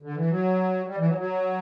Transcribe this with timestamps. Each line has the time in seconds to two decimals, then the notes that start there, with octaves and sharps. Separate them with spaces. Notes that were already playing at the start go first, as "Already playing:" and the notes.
0.02 D3
0.16 E3
0.29 F#3
0.87 G3
0.98 E3
1.07 F#3
1.18 F#3